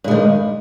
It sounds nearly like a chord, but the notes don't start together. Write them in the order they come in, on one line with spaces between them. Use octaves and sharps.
G2 G#3 D#3